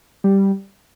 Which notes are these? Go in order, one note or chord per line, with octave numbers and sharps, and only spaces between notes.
G3